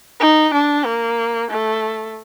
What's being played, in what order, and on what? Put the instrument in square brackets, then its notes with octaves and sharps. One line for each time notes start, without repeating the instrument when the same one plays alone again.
[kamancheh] D#4
D4
A#3
A3